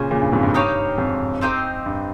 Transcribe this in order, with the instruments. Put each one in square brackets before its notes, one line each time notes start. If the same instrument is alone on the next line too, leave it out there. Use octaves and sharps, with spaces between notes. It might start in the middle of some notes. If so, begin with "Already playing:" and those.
Already playing: [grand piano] A#2 C#3 [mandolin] C#4 G#4 C5
[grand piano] A#2 C#3
G2
F2 G#2
G2
[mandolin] D#4 G4 C#5 F5
[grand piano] F2 G#2
[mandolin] C4 D#4 G4 C5
[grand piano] G2